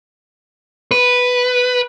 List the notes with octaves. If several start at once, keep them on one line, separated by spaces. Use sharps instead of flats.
B4